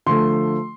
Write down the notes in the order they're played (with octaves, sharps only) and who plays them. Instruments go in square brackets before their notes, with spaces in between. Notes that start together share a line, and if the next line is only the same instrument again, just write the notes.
[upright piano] D3 F3 A3 C6